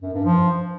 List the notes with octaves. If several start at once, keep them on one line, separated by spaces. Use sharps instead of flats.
F#2
G2
F3